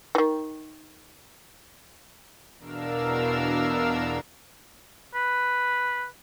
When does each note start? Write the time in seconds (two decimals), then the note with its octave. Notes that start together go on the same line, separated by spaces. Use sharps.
0.15 D#3 E3
2.59 E2 B2 D4 A#4 F5 E6
5.15 B4